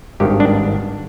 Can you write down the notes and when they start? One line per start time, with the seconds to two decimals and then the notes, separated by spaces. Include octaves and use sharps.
0.20 G#1 G2 D#3 G4
0.40 D4